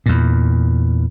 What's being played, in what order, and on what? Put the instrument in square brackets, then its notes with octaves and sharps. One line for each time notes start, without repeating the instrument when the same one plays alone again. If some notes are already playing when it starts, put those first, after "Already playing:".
[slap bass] E2 A#2